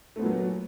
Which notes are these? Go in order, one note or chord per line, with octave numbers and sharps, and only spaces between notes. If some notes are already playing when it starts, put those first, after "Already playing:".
A#2 F#3 A3 B3